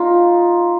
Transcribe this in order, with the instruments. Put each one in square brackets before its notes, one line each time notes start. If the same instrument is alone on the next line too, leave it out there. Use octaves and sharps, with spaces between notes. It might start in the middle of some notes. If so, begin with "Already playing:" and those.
Already playing: [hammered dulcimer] D#4 F4